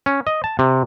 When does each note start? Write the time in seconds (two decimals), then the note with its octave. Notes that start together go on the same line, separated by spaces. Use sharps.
0.06 C#4
0.27 D#5
0.44 A5
0.59 C3